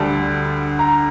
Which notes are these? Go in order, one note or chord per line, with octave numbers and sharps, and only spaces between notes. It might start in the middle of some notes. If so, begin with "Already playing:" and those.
Already playing: D2 D3 G3 A5
A#5